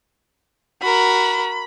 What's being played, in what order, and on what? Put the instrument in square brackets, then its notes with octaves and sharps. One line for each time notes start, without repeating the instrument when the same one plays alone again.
[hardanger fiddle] F#4 A#4 [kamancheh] B5